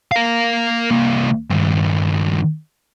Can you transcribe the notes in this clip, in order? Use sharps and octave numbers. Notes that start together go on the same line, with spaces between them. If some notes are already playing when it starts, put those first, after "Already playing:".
A#4 F5
C2 A#3
G2 D#3